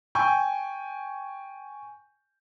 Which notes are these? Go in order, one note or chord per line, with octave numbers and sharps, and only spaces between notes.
G5 G#5 C#6 G6